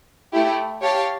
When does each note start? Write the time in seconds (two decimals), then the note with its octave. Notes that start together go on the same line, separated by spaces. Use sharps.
0.33 A3 E4 G4
0.81 G4 C#5 F5 A5